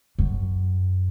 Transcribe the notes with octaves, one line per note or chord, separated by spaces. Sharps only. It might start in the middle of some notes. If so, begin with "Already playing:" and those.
F#2